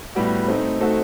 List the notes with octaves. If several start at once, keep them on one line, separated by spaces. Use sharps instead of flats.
A2 G3 B3 F#4
A3 C4 D#4
A3 C4 D#4 F#4 A4